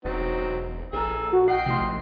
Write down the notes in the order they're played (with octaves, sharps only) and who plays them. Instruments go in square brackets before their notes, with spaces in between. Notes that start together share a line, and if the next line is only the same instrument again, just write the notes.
[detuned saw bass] E1 [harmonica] F#3 C4 D#4
[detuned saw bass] A#1 [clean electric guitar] G#4 A4 A#5 [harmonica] G#5 E6
[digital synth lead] F#4
[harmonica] D#5 G5 [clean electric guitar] F#5 [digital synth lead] C7
[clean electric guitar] F2 A2 C6 [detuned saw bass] C3
[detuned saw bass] A1